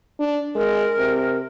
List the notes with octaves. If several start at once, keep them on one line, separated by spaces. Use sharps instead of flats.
D4
G#3 A#4
C3